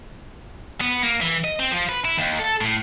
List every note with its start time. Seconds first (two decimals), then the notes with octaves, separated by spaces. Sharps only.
0.81 B3
1.03 A#3
1.21 E3
1.44 D#5
1.60 C4
1.71 F3
1.89 B4
2.05 E4
2.17 D#2
2.39 A4
2.61 A2